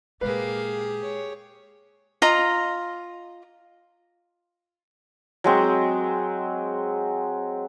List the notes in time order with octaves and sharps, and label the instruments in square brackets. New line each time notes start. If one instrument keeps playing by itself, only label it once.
[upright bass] A#2 G#3 [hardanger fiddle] A#3 F5 [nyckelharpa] G4 G#4 [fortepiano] B4
[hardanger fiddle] C#5
[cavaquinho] F4 D#5 A#5
[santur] F#3 G#3 C4